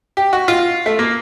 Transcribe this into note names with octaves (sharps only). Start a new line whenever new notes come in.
G4
F#4
F4
A3
A#3